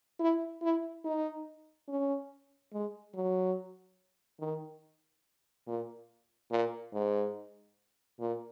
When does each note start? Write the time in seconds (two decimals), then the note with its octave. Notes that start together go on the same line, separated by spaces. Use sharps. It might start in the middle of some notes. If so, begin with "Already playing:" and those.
0.20 E4
0.62 E4
1.05 D#4
1.88 C#4
2.73 G#3
3.15 F#3
4.40 D#3
5.67 A#2
6.51 A#2
6.93 G#2
8.20 A#2